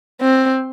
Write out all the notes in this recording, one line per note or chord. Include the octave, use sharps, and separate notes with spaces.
C4